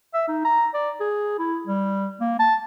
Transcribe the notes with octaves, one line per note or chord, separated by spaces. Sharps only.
E5
D#4
A#5
D5
G#4
E4
G3
A#3
A5